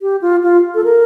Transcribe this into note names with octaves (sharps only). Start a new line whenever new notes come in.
G4
F4
F4
A4
A#4